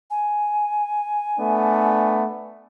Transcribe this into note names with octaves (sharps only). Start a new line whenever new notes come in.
G#5
A3 B3 D4